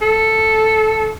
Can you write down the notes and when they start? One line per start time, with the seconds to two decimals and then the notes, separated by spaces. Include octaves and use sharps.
0.02 A4